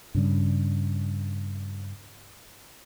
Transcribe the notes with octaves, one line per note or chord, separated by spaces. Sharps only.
G2 C#3 G3